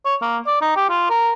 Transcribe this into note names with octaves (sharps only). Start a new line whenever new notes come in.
C#5
A#3
D5
D#4
G4
F4
A#4